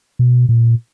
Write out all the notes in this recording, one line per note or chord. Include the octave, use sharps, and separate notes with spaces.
B2
A#2